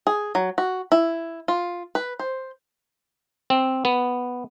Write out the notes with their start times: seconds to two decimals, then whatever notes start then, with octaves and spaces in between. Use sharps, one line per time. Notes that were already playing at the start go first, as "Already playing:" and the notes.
0.07 G#4
0.35 F#3
0.58 F#4
0.92 E4
1.48 F4
1.95 B4
2.19 C5
3.50 C4
3.85 B3